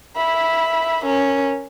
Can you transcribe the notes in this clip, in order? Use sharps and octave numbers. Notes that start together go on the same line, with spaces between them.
E5 B5
C#4 A#4